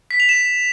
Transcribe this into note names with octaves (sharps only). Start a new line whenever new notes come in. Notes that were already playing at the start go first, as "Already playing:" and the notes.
B6
F7
E7